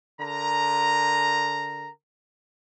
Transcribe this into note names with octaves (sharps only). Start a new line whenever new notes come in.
D3 A#4 A#5